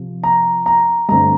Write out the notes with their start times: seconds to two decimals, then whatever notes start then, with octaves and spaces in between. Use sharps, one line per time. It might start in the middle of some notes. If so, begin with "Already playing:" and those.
Already playing: C3 F3
0.24 A#5
0.66 A#5
1.09 G2 D3 A3 C4 A#5